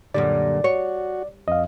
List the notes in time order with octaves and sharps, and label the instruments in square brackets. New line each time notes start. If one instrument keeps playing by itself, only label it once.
[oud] F#2 A#2 G3 [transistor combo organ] D3 [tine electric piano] D5
[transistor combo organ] F#4 [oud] C#5
[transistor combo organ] F2 [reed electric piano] D#5 F5